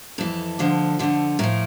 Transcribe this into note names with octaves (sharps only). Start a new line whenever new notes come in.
F2 E3 A4
D2 D3 F3
F2 D3 F3
A2 F3 A#4